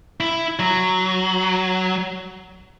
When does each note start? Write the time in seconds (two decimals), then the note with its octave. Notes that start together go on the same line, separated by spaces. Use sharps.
0.20 E4
0.59 F#3